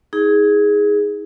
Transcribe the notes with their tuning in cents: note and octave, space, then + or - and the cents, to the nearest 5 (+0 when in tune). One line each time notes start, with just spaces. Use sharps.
D#4 +40 G#4 +0